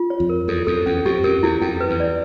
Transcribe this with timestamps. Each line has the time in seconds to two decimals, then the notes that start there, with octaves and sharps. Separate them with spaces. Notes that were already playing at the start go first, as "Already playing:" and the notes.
Already playing: F4
0.10 C#5
0.20 F2
0.29 A#4
0.48 E2 A4
0.67 F2 A4
0.86 E2 C#4
1.05 F2 G4
1.23 F2 A#4
1.43 E2 E4
1.61 F2 G5
1.81 B4
1.90 E2
2.00 D5